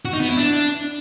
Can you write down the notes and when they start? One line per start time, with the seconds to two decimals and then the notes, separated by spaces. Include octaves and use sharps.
0.05 F#4
0.13 D#4
0.21 B3
0.29 E4
0.37 D4